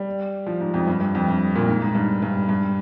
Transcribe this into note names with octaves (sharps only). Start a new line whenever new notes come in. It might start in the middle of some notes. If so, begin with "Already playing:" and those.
Already playing: G3
F3
G#2
F2
G2
G2
F2
G2
A#2
G#2
G#2
G2
G2
G2